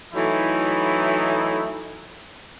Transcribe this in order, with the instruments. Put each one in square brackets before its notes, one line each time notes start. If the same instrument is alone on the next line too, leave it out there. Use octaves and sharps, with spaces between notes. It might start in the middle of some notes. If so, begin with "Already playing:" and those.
[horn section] E3 F#3 A3 D#4 E4